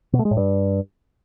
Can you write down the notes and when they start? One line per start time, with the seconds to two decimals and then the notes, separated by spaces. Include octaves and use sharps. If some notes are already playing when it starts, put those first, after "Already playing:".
0.13 B2
0.19 A3
0.25 G#3
0.31 A2
0.37 G2